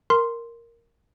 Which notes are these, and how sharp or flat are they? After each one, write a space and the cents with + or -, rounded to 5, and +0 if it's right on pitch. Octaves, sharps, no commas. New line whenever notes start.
A#4 +0 C6 +0